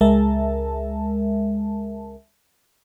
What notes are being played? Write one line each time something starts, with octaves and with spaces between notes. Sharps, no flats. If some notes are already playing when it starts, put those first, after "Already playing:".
C#2 G#3 A#4 E5 A5